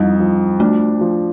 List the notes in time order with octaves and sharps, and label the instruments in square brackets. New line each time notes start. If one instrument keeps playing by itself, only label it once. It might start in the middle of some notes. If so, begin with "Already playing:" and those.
Already playing: [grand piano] F2 D#4 [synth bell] G3
[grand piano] F3
[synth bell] A3 [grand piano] D4
[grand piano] F3